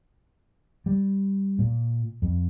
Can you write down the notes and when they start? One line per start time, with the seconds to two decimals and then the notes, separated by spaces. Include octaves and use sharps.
0.86 G3
1.59 A#2
2.22 F2